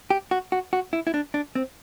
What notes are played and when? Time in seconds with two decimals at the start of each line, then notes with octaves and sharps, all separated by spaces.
0.10 G4
0.31 F#4
0.52 F#4
0.73 F#4
0.93 E4
1.07 E4
1.14 D4
1.34 D4
1.55 C4